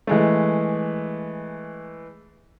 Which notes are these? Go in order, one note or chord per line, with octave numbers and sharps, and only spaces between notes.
E3 G#3 A3